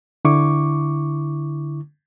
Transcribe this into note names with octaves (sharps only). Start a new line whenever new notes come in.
D3 E4 C#6 D6